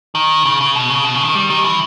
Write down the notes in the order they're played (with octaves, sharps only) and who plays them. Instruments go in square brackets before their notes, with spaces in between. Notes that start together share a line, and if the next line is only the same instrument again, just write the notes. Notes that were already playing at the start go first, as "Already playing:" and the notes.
[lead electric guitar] D#3
C#3
C#3
B2
C#3
B2
C#3
D#3
G3
D#3
E3